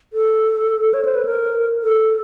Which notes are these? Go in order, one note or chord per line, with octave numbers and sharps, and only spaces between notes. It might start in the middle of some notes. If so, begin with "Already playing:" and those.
A4
C#5
C5
B4
A#4
A4